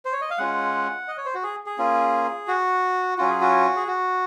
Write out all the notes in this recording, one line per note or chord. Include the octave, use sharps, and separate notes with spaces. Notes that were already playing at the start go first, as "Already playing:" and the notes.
C5
C#5
D#5
F5
G#3 C#4 F4 F#5
D#5
C#5
C5
F#4
G#4
G#4
A#3 C#4 F4
F#4
F#3 C#4 F4 F#4
G#4
F#4
G#4
F#4